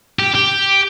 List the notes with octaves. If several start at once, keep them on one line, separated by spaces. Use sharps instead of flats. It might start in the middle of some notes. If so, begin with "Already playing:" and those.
G4
G4